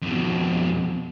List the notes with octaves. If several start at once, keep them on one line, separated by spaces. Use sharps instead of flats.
F2 B2